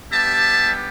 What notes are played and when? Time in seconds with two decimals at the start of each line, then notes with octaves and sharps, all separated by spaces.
0.12 G3 B3 D4 G4 E5 A5